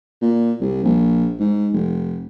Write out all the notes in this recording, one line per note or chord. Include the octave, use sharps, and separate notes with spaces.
A#2
C2
A#1
G#2
F1